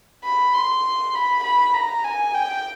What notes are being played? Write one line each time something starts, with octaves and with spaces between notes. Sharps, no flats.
B5
C6
B5
B5
A#5
G#5
G5